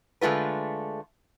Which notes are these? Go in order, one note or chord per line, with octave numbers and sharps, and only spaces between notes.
D3 G#3 A3 F4 B4